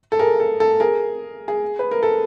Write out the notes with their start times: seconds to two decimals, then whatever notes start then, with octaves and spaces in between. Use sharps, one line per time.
0.12 A4
0.19 G#4 A#4
0.40 A4
0.60 A4
0.80 G#4 A#4
1.48 G#4
1.79 B4
1.91 A#4
2.03 A4